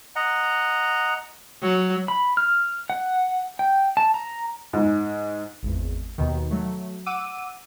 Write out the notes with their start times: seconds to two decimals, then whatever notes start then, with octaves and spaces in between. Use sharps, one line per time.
0.16 D#5 F#5 A#5
1.62 F#3
2.08 B5
2.37 F6
2.90 F#5
3.59 G5
3.97 A5
4.14 A#5
4.73 G#2
5.63 G#1 E2
6.18 D#2 B2 D#3
6.51 F#3 A3
7.06 F#5 D6 E6 D#7